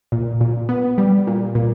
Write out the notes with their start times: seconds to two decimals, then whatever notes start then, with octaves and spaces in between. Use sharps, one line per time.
0.12 A#2
0.41 A#2
0.69 B3
0.98 G3
1.27 A#2
1.55 A#2